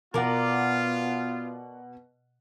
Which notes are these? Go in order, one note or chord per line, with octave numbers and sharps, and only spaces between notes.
B2 B3 F4 A#4 D5 F#5